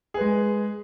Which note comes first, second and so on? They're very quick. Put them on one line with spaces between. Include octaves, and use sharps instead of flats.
G#4 B4 G#3